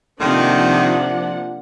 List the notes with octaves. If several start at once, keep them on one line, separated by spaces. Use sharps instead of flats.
F2 C3 D#3 F3 A#3 D4 F#5